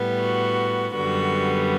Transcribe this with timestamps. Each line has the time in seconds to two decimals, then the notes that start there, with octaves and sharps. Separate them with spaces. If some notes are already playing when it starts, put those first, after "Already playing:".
Already playing: A2 G3 B3
0.21 F#4
0.94 F#2 D3 G3 B3 F#4